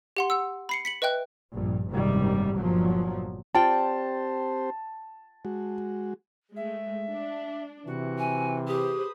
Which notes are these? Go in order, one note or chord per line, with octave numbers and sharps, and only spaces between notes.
G4 F#5 C6
F#5 E6
B5 C7 C#7
B6 C#7 F#7
B4 D#5 E5 G5 F#6
A#1 G2
F#1 G#2 C3 D#3 G3
G1 A#2 F3 F#3
C4 F4 G4 C5 D5 G5 A5
G#3 F#4
G#3 A3 E5
D4
C3 E3 F#4
C4 G#5
G4 G#4 B4 C5 D#6